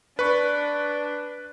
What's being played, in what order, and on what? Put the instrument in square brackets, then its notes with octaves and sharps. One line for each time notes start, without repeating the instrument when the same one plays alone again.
[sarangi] D4 [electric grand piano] B4 C#6